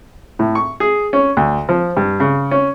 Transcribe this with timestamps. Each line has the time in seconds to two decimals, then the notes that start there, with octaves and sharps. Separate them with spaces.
0.39 A2
0.55 C#6
0.80 G#4
1.13 C#4
1.37 D2
1.69 F3
1.97 G2
2.20 C#3
2.51 C#4